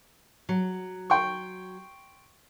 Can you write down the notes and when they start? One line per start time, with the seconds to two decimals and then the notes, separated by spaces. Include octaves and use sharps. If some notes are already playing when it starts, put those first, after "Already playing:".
0.49 F#3
1.10 G5 C6 C#6